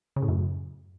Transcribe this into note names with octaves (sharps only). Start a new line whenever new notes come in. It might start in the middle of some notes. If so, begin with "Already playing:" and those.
C#3
A2
F#2